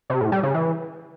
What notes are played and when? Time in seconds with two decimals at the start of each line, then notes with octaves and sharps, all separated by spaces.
0.10 C3
0.21 A2
0.32 G3
0.43 C#3
0.54 E3